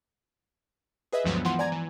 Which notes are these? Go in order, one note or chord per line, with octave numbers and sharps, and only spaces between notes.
G#4 B4 D#5 E5
D2 G2 F3 F#3 G#3 B3
E3 F3 F#5 C6
D5 G#5 A#5 G#6
E3